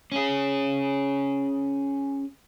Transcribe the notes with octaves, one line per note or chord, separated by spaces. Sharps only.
C#4 G#4